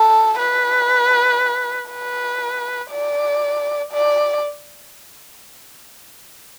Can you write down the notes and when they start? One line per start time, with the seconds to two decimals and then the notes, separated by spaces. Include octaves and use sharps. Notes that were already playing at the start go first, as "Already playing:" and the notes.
Already playing: A4
0.39 B4
1.91 B4
2.91 D5
3.92 D5